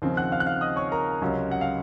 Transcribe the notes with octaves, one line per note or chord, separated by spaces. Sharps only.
D#2 C#3 F3 C4
F#5 F#6
F5 F6
F#6
F5 F6
D#5 D#6
C#5 C#6
A#4 A#5
C#2 C3 F#3 C#4
F#5
F5